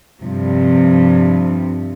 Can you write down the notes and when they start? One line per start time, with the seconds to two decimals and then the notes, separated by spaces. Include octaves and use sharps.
0.21 G2 C3 F3